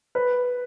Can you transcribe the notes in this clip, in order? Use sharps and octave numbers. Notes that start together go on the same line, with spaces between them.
B4